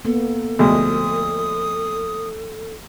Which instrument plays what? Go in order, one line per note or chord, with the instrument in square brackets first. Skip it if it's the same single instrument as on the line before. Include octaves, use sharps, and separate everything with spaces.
[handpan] A#3 B3 [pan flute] A4
[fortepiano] D2 B2 G#3 [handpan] F3 A3 [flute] D#6